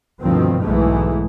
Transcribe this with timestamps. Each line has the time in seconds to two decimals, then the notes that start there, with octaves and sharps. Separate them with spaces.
0.22 D2 G2 B2 D#3 F3 C4
0.63 B1 G#2 E3 G#3 A3